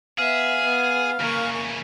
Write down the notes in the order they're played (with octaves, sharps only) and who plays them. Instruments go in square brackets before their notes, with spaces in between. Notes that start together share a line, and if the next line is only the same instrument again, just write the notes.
[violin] B3 E5 [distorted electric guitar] G#4 [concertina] F5
[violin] B3
[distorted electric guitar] C#3 E3 [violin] A#3 C#6